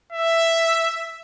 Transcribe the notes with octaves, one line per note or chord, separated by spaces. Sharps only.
E5